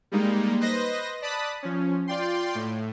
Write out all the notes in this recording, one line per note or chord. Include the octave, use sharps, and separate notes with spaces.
G3 G#3 A#3 D#4
B4 C5 D#5 A#6
D5 A5 B5 D#6 F#6 B6
F3 C#4
F4 D5 G5 C6
A2